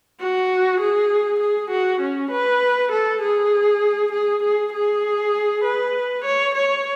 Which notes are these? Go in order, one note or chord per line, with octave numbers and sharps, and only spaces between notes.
F#4
G#4
G#4
F#4
C#4
B4
A4
G#4
G#4
G#4
G#4
B4
C#5
C#5